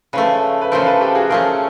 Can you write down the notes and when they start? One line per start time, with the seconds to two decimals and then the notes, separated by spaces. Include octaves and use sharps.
0.13 C#3 F3 A3 B4 C#5
0.61 B4
0.71 C#3 F3 A3 A#4 C5
0.86 A4 B4
1.00 G4 A4
1.15 F#4 G#4
1.30 F3 A3 C#4 G#4 A#4